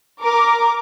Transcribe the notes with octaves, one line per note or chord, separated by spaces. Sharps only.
A#4 D6